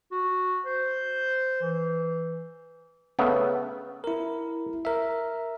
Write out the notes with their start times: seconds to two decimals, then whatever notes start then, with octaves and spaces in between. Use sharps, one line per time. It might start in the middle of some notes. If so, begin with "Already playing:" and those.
0.11 F#4
0.66 C5
1.61 E3
3.19 C#3 A3 B3
4.04 E4 A#4
4.85 A#4 E5